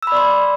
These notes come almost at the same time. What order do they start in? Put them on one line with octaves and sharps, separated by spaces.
E6 B5 D5 C6